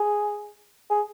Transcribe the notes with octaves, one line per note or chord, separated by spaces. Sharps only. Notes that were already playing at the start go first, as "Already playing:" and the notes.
Already playing: G#4
G#4